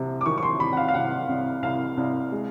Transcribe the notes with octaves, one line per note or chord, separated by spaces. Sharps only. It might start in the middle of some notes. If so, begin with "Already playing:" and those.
Already playing: C2 C3
D6
D#3 C#6
C#6
C6
C2 B5
F#5
F5
F5
C2 F#5
C2
C2 F5
C2
G#3